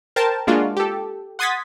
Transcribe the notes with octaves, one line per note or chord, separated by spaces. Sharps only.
A#4 C5 G5 A5
G#3 A#3 D4 F4 F#4
G4 A4
F#5 C6 D#6 G#6 A6 B6